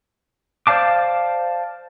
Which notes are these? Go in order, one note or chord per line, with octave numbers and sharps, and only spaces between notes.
C5 D5 F5 A5 D6